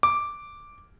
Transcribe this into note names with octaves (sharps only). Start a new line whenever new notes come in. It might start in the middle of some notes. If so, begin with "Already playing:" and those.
D6